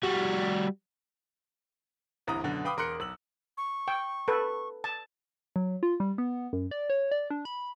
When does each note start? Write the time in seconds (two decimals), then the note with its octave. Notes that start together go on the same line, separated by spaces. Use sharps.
0.03 G3 F#4
2.27 G1 C2 E3 A#5 D#6
2.44 F#2 B2 D3
2.64 B4 F5 G5 B5 D6 D#6
2.77 E1 A#4 C6 F#6 C#7
3.00 B1 E6 F#7
3.57 C#6
3.88 G5
4.28 A4 B4
4.84 A5
5.56 F#3
5.83 F4
6.00 G3
6.18 B3
6.53 F#2
6.71 D5
6.90 C#5
7.11 D5
7.30 D4
7.45 B5